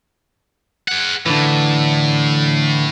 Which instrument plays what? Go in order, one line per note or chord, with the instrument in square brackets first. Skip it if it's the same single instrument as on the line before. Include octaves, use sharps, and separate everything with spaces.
[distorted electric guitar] G#4 F#5
[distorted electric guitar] A2 [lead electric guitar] D3 E3